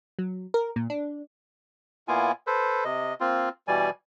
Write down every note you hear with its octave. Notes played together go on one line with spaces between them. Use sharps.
F#3
A#4
A#2
D4
A#2 A#3 B3 E4 F4 G#5
A4 B4 C5
C3 D#5
A#3 C4 F4
B2 E3 G3 D5 G#5